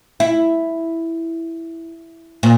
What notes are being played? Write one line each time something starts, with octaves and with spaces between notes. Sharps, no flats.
E4
A#2